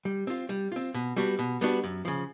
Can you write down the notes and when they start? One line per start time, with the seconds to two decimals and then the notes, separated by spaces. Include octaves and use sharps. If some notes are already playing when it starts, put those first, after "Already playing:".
0.05 G3
0.27 C4 F4
0.49 G3
0.72 C4 F4
0.94 B2
1.16 G3 B3 D4 F#4
1.39 B2
1.61 G3 B3 D4 F#4
1.84 F#2
2.05 C#3 F3